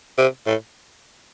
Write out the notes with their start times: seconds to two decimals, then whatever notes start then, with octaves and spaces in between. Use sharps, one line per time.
0.18 C3
0.47 A2